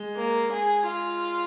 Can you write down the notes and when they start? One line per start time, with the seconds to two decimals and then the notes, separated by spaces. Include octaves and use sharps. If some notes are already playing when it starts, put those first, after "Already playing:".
Already playing: G#3
0.16 A#3
0.51 G#4
0.86 F4